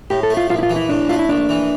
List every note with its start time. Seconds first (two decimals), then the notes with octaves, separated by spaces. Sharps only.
0.10 A2 G4
0.23 A4
0.30 A3
0.37 F4
0.50 A#1 F4
0.59 E4
0.63 F4
0.70 E3
0.76 E4
0.89 A2 D4
1.09 A3 F4
1.19 E4
1.29 A#1 D4
1.49 E3